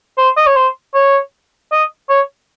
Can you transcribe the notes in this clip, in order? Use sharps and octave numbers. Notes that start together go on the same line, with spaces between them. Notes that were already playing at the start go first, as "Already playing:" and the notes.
C5
D#5
C#5
C5
C#5
D#5
C#5